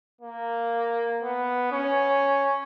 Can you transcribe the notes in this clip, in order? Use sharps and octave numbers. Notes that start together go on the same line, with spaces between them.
A#3
B3
C#4